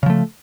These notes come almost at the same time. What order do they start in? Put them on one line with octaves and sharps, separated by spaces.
C#3 F3 A3